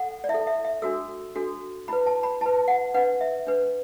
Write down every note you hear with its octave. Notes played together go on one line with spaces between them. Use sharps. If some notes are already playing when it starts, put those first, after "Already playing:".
Already playing: A4 F#5
D5
E4 E5
A4
E5
E5
D4 F#4 A4 E6
D4 F#4 A4
E4 B4 B5
A5
B5
E4 B4 A5
F#5
D4 B4 F#5
E5
D4 B4